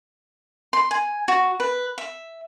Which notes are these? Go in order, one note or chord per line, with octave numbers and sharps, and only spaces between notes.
C6
G#5
F#4
B4
E5